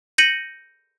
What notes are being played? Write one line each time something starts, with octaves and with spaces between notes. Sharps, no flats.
G6 A#6 C#7 D#7 F#7